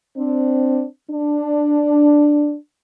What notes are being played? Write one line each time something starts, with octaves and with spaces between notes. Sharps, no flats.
C4 D4
D4